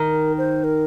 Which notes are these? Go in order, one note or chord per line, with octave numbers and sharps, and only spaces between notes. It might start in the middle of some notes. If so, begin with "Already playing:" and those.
Already playing: D#3 A#4
C5
A#4